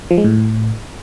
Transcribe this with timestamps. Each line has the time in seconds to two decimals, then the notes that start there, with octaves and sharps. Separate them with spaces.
0.11 F3
0.18 G#3
0.24 A2